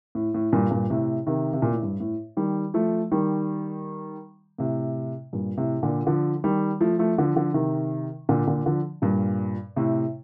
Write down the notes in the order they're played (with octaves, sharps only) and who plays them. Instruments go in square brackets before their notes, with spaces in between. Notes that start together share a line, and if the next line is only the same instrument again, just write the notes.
[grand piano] A2
A2
G2 A#2
G2 A#2
A2 C3
C3 D#3
C3
A#2
A2
G2
A2
D#3 G3
F3 A3
D#3 G3
A2 C3
G2 A#2
A2 C3
A#2 D3
D3 F3
D#3 G3
F3 A3
F3 A3
D3 F3
D3 F3
C3 D#3
A#2 D3
A#2 D3
D3 F3
G2 A#2
A2 C3